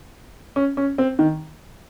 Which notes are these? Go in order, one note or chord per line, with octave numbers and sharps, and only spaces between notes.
C#4
C#4
C4
D#3